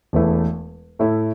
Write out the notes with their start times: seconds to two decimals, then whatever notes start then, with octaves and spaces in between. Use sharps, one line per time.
0.13 E1 E2 E3 A3 E4
0.99 A2 A3 E4 A4